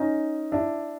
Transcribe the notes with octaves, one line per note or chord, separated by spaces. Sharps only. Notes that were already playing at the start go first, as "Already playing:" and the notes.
Already playing: C#4 D#4
D4 E4